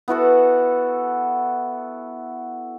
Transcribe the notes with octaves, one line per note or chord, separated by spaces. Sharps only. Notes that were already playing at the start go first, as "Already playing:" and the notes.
B3 E4 F#4 A4